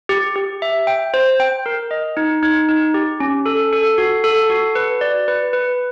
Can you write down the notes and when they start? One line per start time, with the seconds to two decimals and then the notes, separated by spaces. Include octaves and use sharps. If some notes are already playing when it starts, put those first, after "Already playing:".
0.09 G4
0.36 G4
0.62 E5
0.87 G5
1.14 C5
1.40 G5
1.66 A#4
1.91 D#5
2.17 D#4
2.43 D#4
2.69 D#4
2.94 G4
3.20 C#4
3.46 A4
3.73 A4
3.98 F#4
4.24 A4
4.50 F#4
4.75 B4
5.01 D5
5.28 B4
5.53 B4